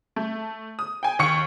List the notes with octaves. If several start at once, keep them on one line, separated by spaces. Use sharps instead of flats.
A3
D#6
G5 G#5
D#2 C#6 C#7